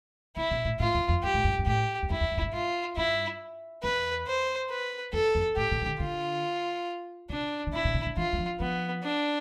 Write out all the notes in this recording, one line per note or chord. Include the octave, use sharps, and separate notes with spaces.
C3 E4
B2
A2
A2 F4
E2
F2
G2 G4
A2
G2
G2
A2 G4
E2
F2 E4
E2
F2
A2
G2
F4
G2 E4
E2 B4
C5
B4
F2 A4
F2
A2 G4
B2
E3
D3
D3 F4
C3 D4
D3
C3 E4
B2
C3
D3
E3 F4
G3
F3
F3 B3
D4